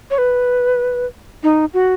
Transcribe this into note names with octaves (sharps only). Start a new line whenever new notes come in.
C#5
B4
D#4
F#4